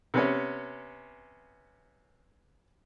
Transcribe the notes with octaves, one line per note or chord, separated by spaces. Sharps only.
C3 B3 C#4